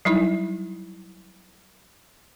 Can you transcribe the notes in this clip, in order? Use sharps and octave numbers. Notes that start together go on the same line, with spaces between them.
F#3 G3 D#4 E4